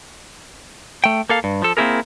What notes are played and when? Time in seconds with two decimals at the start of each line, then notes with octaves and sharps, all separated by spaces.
1.04 A3 G5
1.29 A#3 A4 F5
1.44 G2
1.62 F3 A4
1.77 A#3 C4 C#4 E4 G#4 A#4